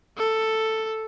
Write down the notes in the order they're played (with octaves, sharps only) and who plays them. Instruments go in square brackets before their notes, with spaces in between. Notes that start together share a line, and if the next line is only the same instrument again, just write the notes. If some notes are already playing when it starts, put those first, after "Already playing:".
[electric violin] A4